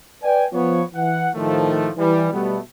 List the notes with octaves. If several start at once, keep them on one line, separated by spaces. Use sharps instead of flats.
B4 D5 G5 G#5
F3 B3 C#5
E3 F#5
A2 D#3 F3 A3
E3 G3
B2 G3 A3 B3